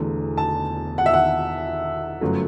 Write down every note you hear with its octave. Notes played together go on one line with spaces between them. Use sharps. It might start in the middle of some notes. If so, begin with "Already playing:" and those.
Already playing: E1 E2 D3 A3
A5
F#5
E5
F#5
G1 F#2 F#3 A3